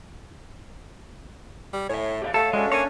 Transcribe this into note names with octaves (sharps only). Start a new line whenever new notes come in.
G3
A2 C#5 E5 G#5
E2 G4 D#5 F5
A3 A4 C#5 E5 F5
G#3 C#4 D4 F#4 A4
A#3 C#5 G#5